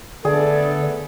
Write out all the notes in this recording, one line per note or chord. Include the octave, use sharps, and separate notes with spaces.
D3 A3 B3 G#4 A4 D5